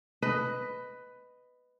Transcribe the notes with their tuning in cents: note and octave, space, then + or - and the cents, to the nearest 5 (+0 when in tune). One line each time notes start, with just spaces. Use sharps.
B4 +10 D#5 +0